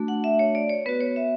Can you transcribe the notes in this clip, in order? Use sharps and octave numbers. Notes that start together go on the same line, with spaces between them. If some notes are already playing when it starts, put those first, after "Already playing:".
Already playing: A3 D4 F#4
F#5
E5
C#5
D5
C#5
B3 F#4 B4
C#5
E5